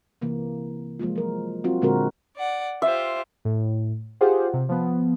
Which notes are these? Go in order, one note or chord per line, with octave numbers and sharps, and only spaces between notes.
C3 E3 A#3
F3 G#3 A#3 F4
F#3 A#4
F#3 C4 F4 F#4
A#2 D3 G#3 C4 F#4 A#4
D5 F#5
F4 G4 C5 E5
A2
F4 G4 G#4 C5 F#5
C3
F3 B3